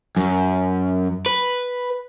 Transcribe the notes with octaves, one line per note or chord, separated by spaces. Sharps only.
F#2
B4